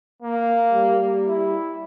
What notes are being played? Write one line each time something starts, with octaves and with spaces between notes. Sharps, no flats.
A#3
G3
E4